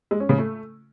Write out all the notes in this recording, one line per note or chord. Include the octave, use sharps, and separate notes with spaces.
G#3
C#4
C#3
A3